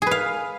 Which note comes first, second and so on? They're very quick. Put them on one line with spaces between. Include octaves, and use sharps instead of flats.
G#4 B4 F5